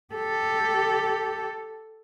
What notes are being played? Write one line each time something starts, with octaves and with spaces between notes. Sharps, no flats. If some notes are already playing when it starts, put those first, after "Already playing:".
G4 A4